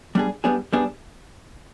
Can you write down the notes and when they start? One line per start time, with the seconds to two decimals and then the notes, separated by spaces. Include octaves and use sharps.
0.15 G3 B3 D4 G#4
0.44 G3 B3 D4 G#4
0.73 G3 B3 D4 G#4